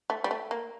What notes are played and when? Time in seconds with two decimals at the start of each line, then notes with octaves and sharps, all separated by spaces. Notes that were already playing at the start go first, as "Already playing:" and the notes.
0.10 A3
0.24 G3
0.31 A3
0.51 A#3